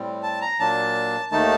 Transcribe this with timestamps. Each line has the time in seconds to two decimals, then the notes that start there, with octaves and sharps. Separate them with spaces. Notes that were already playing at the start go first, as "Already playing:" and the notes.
Already playing: A2 G3 C4
0.23 A5
0.41 A#5
0.59 A#2 F#3 A#3 D4 A5
1.31 D#2 D#3 A3 D#4 A5